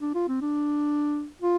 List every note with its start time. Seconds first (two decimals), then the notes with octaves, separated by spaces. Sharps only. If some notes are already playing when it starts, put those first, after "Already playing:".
0.01 D4
0.15 F4
0.28 C4
0.41 D4
1.42 F4